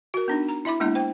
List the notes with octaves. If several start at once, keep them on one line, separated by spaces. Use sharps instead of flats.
F#4 A#4
B3 D4 D#4
A#5
E4 E5 B5 D6
G#3 A#3 B3 D4 E4
C5 G5